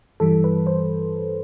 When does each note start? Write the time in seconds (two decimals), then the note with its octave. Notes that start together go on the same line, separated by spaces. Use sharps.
0.20 G2 E3 G3 A4
0.44 B4
0.67 C5